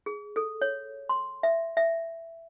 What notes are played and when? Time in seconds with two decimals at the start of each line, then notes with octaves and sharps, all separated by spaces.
0.06 G#4
0.36 A4
0.62 C#5
1.09 C6
1.43 E5
1.77 E5